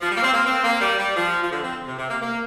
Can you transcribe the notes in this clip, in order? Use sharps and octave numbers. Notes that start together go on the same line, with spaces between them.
F3
G3
A#3
C4
A#3
C4
A#3
G3
G3
F3
F3
D3
C4
C3
C3
A#3
A#3